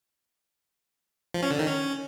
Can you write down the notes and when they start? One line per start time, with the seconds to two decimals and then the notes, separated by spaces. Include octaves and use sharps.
1.34 F3
1.43 C#4
1.51 D3
1.59 D#3
1.67 C#4